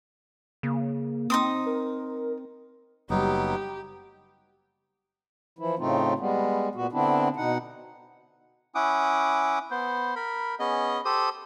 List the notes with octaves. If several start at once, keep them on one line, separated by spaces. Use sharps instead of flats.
C#3 A#3
C4 D#4 C6 D#6
A#4
F#1 F#3 G3 B3 D#4 G4
E3 F3 E4
A2 C#3 A3 C4 D#4 F4
G3 G#3 B3
A#2 B3 F#4
D3 B3 C4 D4 E4
B2 D#4 F#5
C#4 E4 F#5 D6 D#6
B3 C5
A#4 B5
B3 C#4 G#4 D#5
G4 A4 C5 D#6